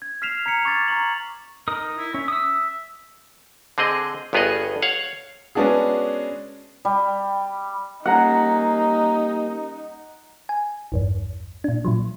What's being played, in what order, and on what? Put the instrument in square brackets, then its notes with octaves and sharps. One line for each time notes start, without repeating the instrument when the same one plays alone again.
[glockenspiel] G#6
F6 B6 C7 E7 F7
A#5 G#6 B6 C#7 F7
C#6 D6 G#6 A6 B6
A#5 C#6 F#7
[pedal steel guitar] D#4 A#4 D#6
[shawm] E4
[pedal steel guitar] C#4 [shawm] E5
[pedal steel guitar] D#6 E6
[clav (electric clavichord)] D3 C4 G#4 D#5
G1 G2 B3 G#4 C#5 D#5
C#5 F5 F#5
[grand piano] G#3 B3 C#4 D4 F#4 G#4
[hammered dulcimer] G3
[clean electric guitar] G3 A#3 C#4 [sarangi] D#4 [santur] F#5 A#5
[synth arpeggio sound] G#5
A1 E2 G2
A#2 D4
A#2 F3 F#3